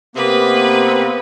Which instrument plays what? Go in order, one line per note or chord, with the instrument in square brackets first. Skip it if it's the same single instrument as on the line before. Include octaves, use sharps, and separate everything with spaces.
[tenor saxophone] C3 [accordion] A#3 B3 [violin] B4